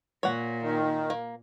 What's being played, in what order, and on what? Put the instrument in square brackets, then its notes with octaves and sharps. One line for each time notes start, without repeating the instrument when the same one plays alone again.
[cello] A#2 [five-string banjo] C#5 F#5
[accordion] D#3
[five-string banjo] A#3